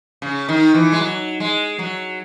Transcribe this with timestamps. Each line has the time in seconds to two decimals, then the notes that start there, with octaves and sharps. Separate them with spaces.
0.22 C#3
0.49 D#3
0.74 E3
0.92 G#3
1.00 F#3
1.40 G#3
1.79 F#3